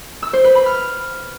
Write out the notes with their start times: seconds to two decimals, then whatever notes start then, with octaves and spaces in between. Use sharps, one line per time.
0.23 E6
0.33 C5
0.44 B4
0.55 B5
0.66 F6